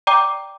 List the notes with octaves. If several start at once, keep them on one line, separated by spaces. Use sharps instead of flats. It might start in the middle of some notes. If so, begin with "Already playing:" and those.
D5 G5 A#5 D6